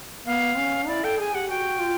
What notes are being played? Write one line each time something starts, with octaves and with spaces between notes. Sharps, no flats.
B3 F5
C#4
E4 D5
A4 G5
G#4 G#5
G4 F#5
F#4 G5
F4